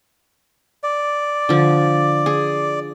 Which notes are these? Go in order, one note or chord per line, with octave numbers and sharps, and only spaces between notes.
D5
D3 F3
G#4